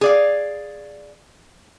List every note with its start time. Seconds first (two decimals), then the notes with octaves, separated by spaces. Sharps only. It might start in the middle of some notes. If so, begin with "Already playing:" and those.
0.01 G#4 D5 F5